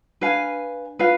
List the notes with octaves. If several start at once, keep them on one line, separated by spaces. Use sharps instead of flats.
D4 B4 F5 G#5
F4 B4 F5